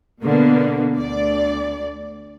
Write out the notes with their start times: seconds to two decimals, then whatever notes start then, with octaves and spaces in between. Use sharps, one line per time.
0.23 B2 D3 A#3 B3
0.98 D2 D5